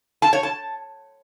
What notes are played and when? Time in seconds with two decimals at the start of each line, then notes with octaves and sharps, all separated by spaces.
0.22 A5
0.33 C#5
0.43 A5